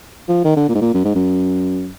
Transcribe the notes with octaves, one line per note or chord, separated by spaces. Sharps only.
F3
D#3
D3
A#2
G#2
A#2
F#2
G#2
F#2